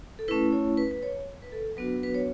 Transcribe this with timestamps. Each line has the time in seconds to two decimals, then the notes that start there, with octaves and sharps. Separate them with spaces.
0.19 A4
0.28 A3 C#4 E4 B4
0.52 C#5
0.77 B4
0.91 B4
1.03 C#5
1.42 B4
1.52 A4
1.77 F#3 B3 D4 F#4 B4
2.03 B4
2.14 C#5